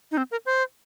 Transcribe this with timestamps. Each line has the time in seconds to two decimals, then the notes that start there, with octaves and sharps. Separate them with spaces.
0.12 D#4
0.17 C4
0.31 A#4
0.46 C5